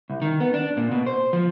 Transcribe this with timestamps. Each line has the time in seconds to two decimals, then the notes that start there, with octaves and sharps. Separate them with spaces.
0.10 C2
0.22 D#3
0.40 B3
0.54 D4
0.77 A#2
0.91 B2
1.07 C5
1.33 F3